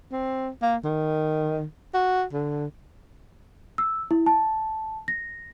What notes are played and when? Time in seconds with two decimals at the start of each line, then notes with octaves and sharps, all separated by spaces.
0.12 C4
0.62 A#3
0.84 D#3
1.94 F#4
2.33 D3
3.78 E6
4.11 E4
4.26 A5
5.08 A#6